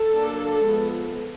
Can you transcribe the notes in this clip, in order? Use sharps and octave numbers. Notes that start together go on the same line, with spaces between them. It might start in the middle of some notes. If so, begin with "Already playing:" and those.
Already playing: A4
F#3 A#3 D4
F3 G#3 B3